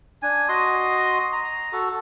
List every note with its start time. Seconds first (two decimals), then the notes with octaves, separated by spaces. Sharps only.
0.22 D4 G#5
0.49 F#4 D#5 C6 D#6
1.32 A#5
1.73 F#4 A4